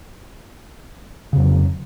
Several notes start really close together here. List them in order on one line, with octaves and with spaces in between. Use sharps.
C#3 F2 F#3